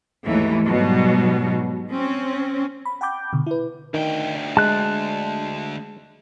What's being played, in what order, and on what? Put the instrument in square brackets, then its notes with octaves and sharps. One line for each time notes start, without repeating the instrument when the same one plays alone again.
[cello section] D#2 G#2 E3 A3
G#2 B2 F#3 G3
C4 C#4
[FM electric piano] B5
F#5 G5 A5 B5 D6 G6
B2 D3
E4 B4
[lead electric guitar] D2 G5 [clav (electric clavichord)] D#3
[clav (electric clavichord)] G#3 [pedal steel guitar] A5 F#6